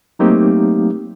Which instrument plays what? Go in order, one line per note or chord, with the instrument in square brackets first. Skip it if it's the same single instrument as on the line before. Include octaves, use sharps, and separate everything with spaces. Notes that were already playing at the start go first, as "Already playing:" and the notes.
[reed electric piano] F#3 A3 A#3 C4 D#4 G4